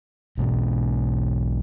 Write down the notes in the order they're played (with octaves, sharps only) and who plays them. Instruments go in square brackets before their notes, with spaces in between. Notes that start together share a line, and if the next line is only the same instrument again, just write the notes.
[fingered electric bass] B1 G#2 B2